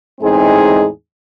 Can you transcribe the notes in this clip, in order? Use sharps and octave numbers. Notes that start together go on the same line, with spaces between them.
E2 A2 G#3 C4 D#4 G#4